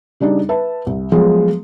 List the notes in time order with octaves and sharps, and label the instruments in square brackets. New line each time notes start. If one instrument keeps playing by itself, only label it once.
[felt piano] C#3 G3 D4 D#4
B4 E5 A5
C2
F3 F#3 G#3 A3 B3